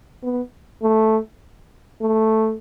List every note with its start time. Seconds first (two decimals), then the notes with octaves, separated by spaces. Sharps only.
0.23 B3
0.83 A3
2.01 A3